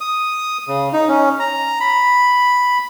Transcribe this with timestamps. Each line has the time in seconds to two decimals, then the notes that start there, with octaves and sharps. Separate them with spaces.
0.01 D#6
0.68 C#3
0.93 D#4
1.08 C#4
1.39 A#5
1.80 B5